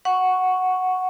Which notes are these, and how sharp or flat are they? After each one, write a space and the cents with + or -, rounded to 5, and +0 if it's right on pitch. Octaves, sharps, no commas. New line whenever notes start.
F#5 +0 C#6 +0